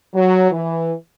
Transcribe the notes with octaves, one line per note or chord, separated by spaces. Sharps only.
F#3
E3